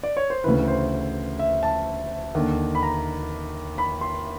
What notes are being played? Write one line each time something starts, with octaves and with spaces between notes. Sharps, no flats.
D5
C#5
C5
D2 C#3 E3 B4
C5
E5
A5
D#2 D3
B5
A#5
B5
C6